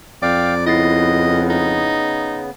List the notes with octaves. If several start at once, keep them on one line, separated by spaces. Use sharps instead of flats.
F2 D5 F5 G5
C#3 B3 E4 D#5 A6 C7
D#4